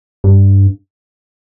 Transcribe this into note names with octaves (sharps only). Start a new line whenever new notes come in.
G2